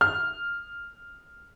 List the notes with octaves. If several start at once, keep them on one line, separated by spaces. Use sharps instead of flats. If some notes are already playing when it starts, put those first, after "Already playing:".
F6